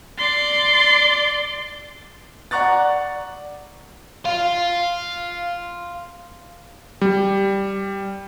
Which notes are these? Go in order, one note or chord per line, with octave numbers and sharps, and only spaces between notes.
D5 C6
D5 F#5 A#5 C#6 F#6 A6
F5 C6
G3